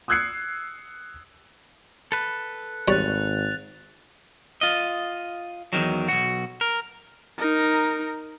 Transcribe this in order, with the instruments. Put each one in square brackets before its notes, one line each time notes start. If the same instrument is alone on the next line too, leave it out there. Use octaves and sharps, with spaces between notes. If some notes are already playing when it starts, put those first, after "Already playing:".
[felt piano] D#6 E6 F#6 G#6 C7 C#7
[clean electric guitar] A4 B4
[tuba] G#1 [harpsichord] G3 C#5 [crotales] F#6 A6 F7
[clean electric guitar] F4 D#5
E2 G#2 D#3 F#3
B1 F#4
A#4
[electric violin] D#4 A#4